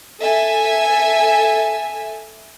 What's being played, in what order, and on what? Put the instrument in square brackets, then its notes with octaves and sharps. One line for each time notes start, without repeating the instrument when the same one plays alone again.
[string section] A4 E5 G#5